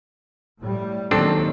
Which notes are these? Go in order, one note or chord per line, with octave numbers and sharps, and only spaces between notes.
A2 G3
D#2 D#3 F#3 C4 D4 A4